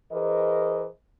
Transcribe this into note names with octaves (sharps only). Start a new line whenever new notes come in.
E3 G#4 A#4 C5 D#5